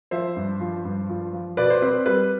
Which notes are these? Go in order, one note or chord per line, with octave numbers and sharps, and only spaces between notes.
F3 C5 E5
G2
F3
G2
F3
F3
B2 B4 D5
C5
C4 B4
G3 B4